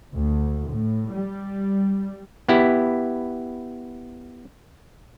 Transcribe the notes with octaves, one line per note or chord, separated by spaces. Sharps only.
D2
A2
G3
B3 E4 G4